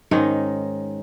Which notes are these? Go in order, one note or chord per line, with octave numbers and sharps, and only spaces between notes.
G#2 D#3 C#4 D#4